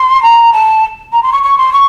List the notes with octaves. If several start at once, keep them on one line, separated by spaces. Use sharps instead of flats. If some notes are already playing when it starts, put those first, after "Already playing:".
Already playing: C6
A#5
A5
A#5
C6
C#6
C#6
C6
C#6